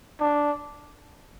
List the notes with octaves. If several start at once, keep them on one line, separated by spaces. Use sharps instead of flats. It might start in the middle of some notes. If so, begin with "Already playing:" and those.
D4